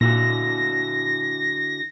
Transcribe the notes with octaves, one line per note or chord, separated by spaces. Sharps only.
A#2 D3 E4 F#4 A#6